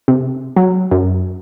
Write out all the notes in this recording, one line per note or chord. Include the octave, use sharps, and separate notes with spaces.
C3
F#3
F#2